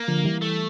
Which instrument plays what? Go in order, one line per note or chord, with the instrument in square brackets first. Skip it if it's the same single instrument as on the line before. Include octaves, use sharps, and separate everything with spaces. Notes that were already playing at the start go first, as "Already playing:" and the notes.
Already playing: [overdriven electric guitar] A#3
[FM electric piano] D3 F3
E3 G3
[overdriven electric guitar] A3